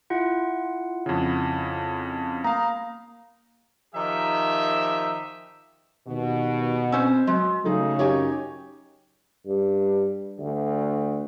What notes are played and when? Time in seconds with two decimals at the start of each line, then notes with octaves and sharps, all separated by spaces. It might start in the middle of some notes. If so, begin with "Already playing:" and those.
0.10 E4 F4 F#5
1.06 F2 C#3
2.44 A#3 F5 A#5
3.95 D#3 F3 D#4 G4 E5
6.08 D#2 B2
6.92 C4 C#4 C5 E6
7.27 F#3 G#3
7.65 C#3 F#3 A3 D#4 G#4
7.99 F#2 D#4 G4 C#5 G5 G#5
9.46 G2
10.39 D2